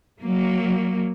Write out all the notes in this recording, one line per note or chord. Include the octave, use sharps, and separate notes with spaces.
F#3 A#3